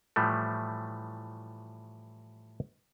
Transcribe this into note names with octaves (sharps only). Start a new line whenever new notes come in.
A2 E3 F3 G3 A3